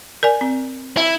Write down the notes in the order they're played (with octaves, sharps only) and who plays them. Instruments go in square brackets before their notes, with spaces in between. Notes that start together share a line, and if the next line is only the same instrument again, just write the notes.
[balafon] A#4 D5 G#5
C4
[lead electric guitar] E4